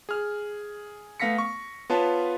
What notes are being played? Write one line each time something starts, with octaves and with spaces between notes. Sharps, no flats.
G#4 F6
A3 B3 F5 A#6 B6 C#7
C#6
B3 F4 B4 C#5 A5